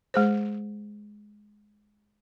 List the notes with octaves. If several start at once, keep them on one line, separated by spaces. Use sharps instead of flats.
G#3 G#4 C5